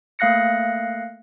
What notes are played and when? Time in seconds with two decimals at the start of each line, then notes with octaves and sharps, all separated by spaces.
0.19 A3 A#3 F5 F#6 A#6 C#7